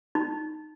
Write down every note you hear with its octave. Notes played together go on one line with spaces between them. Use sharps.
D#4